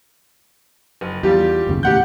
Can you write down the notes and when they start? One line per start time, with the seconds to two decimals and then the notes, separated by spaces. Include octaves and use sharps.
1.01 F#1
1.23 E2 G3 F4 G4
1.67 F#1 D#2 C#3
1.83 D#1 E2 A2 G4 F#5 G6